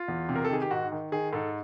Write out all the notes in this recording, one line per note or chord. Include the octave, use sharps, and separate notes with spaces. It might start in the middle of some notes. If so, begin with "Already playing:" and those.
Already playing: F4
E2
C3
A#4
A4
D#3 G#4
G4
G#2 F#4
D#3
D#3 G#4
G#2 A4